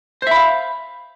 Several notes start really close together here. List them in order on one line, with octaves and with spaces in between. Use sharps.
C5 E5 B5 F5